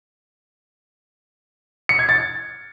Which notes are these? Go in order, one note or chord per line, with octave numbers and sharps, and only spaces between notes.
C#7
G#6
A6